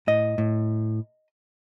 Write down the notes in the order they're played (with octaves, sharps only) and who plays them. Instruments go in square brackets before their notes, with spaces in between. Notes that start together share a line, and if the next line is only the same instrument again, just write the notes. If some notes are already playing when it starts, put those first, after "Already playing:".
[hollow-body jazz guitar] A2 D#5
A2